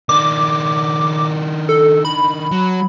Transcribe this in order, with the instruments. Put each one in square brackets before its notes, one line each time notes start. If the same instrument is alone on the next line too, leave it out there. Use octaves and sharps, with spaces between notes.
[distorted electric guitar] D#3 D4 [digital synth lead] D6
[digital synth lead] A4
B5
[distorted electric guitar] F#3